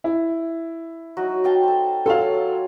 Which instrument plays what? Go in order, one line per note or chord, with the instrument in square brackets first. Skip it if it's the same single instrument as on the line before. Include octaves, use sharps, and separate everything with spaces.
[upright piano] E4
[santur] F#3 D#4 F#4
F5 G5 A5
A4 C5
[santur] F#3 F4 C#5 [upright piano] A4 F5